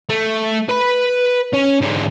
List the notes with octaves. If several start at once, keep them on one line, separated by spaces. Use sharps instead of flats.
A3
B4 B5
C#4
G#2 D3